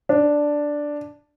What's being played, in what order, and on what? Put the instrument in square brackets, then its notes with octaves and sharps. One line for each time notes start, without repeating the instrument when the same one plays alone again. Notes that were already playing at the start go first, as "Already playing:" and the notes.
[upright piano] D4